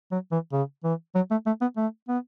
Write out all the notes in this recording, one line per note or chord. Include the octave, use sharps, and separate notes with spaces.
F#3
E3
C#3
E3
F#3
A3
A3
B3
A3
B3